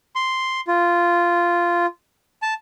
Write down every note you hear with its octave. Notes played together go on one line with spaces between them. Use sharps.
C6
F4
A5